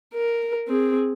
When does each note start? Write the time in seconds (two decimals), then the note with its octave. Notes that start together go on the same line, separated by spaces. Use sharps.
0.14 A#4
0.68 C4 G#4